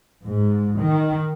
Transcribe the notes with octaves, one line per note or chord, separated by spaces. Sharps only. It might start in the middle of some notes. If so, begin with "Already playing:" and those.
G#2
D#3